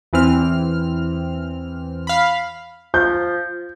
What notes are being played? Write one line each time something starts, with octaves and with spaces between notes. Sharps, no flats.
E2 E3 C4 F6
F5 B5
F3 G6